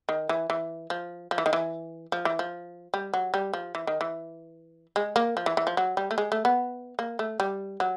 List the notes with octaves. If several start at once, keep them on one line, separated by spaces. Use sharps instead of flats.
D#3
E3
E3
F3
F3
E3
D#3
E3
F3
E3
F3
G3
F#3
G3
F3
E3
D#3
E3
G#3
A#3
F3
E3
E3
F3
F#3
G3
A3
G#3
A3
B3
A#3
A3
G3
F#3